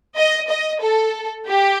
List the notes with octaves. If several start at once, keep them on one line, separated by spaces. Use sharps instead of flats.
D#5
D#5
A4
G4